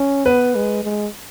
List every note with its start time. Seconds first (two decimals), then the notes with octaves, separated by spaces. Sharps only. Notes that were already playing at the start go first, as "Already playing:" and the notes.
Already playing: C#4
0.26 B3 B4
0.55 G#3
0.84 G#3